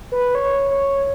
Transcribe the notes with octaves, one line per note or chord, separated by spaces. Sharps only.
B4
C#5
C#5